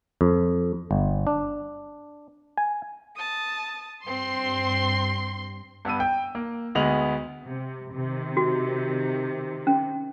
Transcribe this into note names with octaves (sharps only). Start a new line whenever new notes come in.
F2
G1
D4
G#5
A5 D#6
G2 C4 C6
G2 B3 E6 D#7
G5
A#3
D2 G#3 B3 D#5 F7 F#7
C3
C3 D#3
F#4
C#4